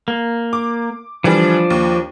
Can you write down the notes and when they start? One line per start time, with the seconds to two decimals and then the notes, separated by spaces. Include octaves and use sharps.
0.08 A#3
0.53 D6
1.24 D3 E3 F3 G3 D4
1.70 D#2